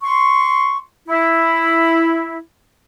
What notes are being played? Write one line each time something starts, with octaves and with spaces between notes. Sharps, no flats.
C6 C#6
E4